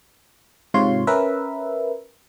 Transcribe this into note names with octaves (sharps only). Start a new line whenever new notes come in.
G#2 C3 F4 C#5 C6
C#4 A#4 B4 E5